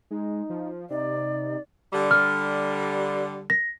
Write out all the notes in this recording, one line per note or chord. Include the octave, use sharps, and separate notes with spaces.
G#3 D#4
F3
C3 D#4 D5
D3 G3
F6
A#6